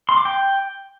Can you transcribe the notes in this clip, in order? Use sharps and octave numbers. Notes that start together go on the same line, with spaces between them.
C6
D6
G5